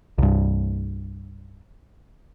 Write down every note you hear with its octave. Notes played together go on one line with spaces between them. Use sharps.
C2 G2